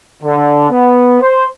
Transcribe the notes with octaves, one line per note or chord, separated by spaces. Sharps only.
D3
B3
C5